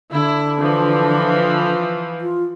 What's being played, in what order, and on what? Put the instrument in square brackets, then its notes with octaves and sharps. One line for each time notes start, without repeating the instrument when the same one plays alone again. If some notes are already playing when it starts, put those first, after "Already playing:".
[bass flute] D3 [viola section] E4
[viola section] E3 F3
[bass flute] F4